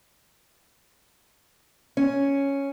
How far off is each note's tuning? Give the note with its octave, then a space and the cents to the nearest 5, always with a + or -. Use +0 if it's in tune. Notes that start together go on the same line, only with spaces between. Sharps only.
C#4 +0